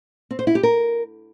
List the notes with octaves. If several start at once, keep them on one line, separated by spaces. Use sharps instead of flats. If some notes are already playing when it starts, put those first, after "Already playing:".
C4
C5
E4
G4
A#4